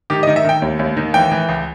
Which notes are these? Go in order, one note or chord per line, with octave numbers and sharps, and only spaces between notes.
D#3 G4
D#5
D#3
E5
D#3 G5
D#2
D#2
D#3
E3 G5
E3
C#2